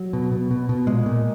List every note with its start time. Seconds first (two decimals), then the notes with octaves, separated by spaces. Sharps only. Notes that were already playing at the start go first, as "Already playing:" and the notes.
Already playing: F#3
0.13 B2
0.32 B2
0.51 B2
0.69 B2
0.87 A#2 G#3
1.06 A#2